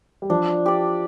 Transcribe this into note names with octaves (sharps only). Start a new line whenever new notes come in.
G3
F3 D4
G4 D5